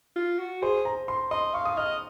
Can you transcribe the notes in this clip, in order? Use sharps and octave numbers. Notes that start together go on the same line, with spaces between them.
F4
F#4
G#4 C5
A#5
C6
D#5 C6
F5 C#6
D#6
D#5 F6